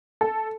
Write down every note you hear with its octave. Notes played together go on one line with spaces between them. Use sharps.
A4